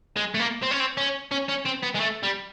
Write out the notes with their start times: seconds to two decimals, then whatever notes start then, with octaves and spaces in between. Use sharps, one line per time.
0.17 G#3
0.34 A3
0.40 A#3
0.62 C4
0.71 C#4
0.80 C4
0.97 C#4
1.31 C#4
1.49 C#4
1.65 C4
1.83 B3
1.95 G#3
2.00 A3
2.23 G3